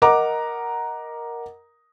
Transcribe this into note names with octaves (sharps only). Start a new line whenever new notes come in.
A#4 D#5 F#5 A#5 D6